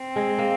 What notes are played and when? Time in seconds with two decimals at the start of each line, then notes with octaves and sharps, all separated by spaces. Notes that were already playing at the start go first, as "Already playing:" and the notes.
Already playing: C4
0.16 G#3
0.38 A#3